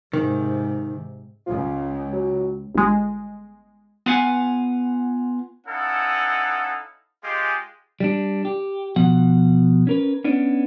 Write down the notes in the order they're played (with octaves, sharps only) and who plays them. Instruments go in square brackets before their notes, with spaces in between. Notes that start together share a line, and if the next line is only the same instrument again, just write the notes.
[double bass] G#2 C3 [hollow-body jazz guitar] D#3
[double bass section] C#2 [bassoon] F4
[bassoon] F#3
[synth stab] G1 G#3
[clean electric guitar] B3 F4 B4 F5 F#5 G#5
[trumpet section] C#4 D#4 E4 A4 F5 F#5
G#3 F4 G4
[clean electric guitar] G3 D4
G4
B2 F3 F#5
C#4 A#4 B4
B3 C#4 D4